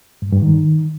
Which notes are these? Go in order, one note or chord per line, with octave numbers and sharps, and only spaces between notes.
G2
G2
D#3